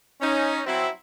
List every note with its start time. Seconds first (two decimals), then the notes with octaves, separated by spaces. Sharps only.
0.21 C#4 D#4
0.66 F#3 C4 E4